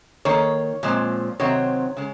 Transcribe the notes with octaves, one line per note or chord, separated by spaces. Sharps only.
D#3 A#3 C#5
A#2 F3 G#3 C4
C3 D#3 F#3 C4 C#5
C#3 G#3